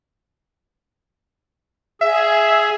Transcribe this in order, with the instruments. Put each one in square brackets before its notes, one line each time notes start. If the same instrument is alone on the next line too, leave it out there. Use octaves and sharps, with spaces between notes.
[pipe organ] G#4 [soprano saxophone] E5